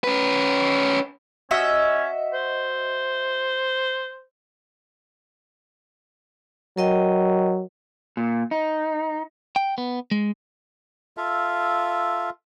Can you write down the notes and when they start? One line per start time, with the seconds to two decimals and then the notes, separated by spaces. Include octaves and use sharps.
0.04 C#4 B4
1.51 C#4 F#4 D#5 E5
2.33 C5
6.78 F#3 A#4 D#5 G5
8.17 A#2
8.51 D#4
9.56 G5
9.78 B3
10.11 G#3
11.17 F4 A4 E5 F5